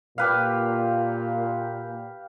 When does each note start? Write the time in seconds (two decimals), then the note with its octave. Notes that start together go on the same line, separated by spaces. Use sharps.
0.18 A#2 G4 B4 F5